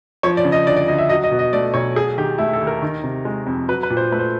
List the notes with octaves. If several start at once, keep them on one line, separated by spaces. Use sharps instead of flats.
F3 C#5
D5
C#3
D#5
D2 D5
D5
D2 D#5
E5
F#3 D#5
D#5
B2
D#5
A3 D5
B1 C#5
F#3 G#4
D#3 G4
A3 E4
A4
D#2
A#4
D#3
C3
G#3
F2
F#3 B4
B4
A#2
C5
A3 B4
C5